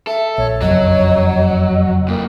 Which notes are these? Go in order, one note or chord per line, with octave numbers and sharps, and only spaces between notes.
A4 E5
A#1 C#5
F#1 F2 F#3 D#5
F2 A2 A#3